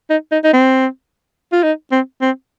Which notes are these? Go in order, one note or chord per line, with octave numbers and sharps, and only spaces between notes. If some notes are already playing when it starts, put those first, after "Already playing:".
D#4
D#4
D#4
C4
F4
D#4
C4
C4